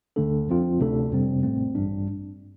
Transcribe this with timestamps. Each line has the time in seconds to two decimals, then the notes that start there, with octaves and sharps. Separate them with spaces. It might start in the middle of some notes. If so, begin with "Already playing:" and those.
0.16 D2 D3 A3 D4 A4
0.47 F2 F3 C4 F4
0.79 D2 C3 A3 D4 A4
1.11 G1 F2 C3 G3 C4
1.43 A1 A2 A3 C4
1.75 A1 G2 G3 D4